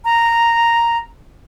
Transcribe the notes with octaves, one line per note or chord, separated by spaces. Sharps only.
A#5